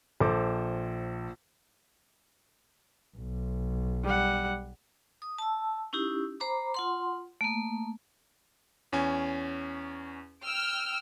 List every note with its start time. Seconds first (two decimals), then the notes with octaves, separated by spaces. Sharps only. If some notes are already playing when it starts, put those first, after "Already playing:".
0.20 A#1 A4 C5 D6
3.17 B1
4.04 G3 F#5
5.22 D#6
5.38 A5 E6
5.93 C#4 D#4 E4 G4
6.40 C5 A#5 B5 D6
6.74 F4 F#5 C6
7.41 A3 A#3
8.93 E2 C#4 G#5
10.42 G5 E6 F6